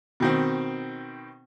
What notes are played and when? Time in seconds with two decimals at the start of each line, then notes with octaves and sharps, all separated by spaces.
0.20 B2 D#3 C4